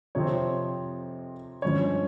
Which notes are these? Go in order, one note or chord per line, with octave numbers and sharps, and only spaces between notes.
F2 C3 F3 C4 C#5
G2 F3 G#3 C#4 C#5